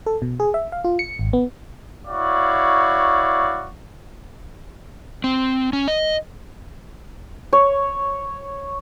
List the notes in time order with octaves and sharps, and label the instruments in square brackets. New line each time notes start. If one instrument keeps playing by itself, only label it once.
[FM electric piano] A4
B2
G#4
E5
F5
F4
C#7
G#1
B3
[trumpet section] E4 F#4 C#5 D5 F5
[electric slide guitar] C4
C#4
D#5
[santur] C#5